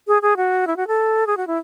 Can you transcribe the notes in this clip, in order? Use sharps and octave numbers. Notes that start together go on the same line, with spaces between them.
G#4
G#4
F#4
E4
F#4
A4
G#4
F#4
E4